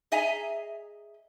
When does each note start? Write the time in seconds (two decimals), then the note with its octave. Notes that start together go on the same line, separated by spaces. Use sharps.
0.12 G#4 D#5 E5 G#5 A#5